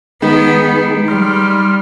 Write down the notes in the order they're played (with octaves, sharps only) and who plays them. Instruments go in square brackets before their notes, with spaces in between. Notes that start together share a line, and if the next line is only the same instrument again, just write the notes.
[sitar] D#3 [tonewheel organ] G#3 D#4 G#4 [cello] B3
[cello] G3 [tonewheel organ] C6 F6